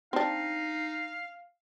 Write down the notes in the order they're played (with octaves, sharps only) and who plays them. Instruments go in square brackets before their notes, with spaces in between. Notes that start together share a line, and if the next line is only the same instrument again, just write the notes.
[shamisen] C4 D4 [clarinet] D#4 [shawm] F5